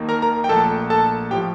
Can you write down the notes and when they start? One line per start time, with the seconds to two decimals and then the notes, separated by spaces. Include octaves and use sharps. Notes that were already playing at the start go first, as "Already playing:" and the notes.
Already playing: D#2 D#3 A#3 D#4
0.09 A#4 A#5
0.22 A#4 A#5
0.44 G5
0.49 A#1 A#2 A3 A4 A5
0.90 A4 A5
1.31 A2 F3 G4 G5